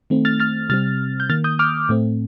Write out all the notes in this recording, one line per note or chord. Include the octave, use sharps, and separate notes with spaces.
D#3 A3 C4
F6 A6
F6 A6
C3 G3 C4 F6 A6
G6
D#3 A#3 F6 A6
D#6 G6
D6 F6
A2 A3 C4